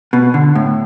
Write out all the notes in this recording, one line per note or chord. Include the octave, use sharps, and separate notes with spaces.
B2
D3
A2